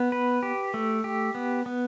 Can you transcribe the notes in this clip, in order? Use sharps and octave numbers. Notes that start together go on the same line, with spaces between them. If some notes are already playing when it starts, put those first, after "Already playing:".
Already playing: B3
B4
G4
A3
G4
B3
B3